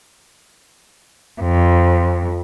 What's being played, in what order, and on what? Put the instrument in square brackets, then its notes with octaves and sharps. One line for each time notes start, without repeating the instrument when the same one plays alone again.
[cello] F2